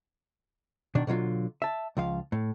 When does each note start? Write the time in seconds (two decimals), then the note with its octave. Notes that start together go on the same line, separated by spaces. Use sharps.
0.95 B2 D#3 D4
1.07 B2 D3 F#3 F4
1.62 E5 A5
1.97 C#2 F3 F5
2.32 A2